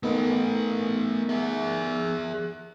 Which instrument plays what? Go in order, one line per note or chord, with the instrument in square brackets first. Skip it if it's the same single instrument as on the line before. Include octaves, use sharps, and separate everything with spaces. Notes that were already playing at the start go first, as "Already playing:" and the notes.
[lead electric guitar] A3 B4 [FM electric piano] B3 D#4 A#4
[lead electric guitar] G#4 E5